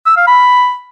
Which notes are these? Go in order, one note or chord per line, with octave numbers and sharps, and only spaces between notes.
E6
F5
B5